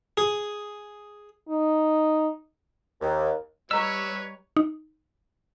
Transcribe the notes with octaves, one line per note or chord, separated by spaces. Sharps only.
G#4
D#4
D#2
G3 B4 C#5 D#5 A#5 E6
D#4